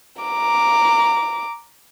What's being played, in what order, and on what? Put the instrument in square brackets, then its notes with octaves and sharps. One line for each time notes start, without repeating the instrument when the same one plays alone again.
[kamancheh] A#5 D6